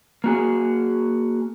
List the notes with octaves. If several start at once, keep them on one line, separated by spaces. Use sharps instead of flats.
A#3 F#4 G#4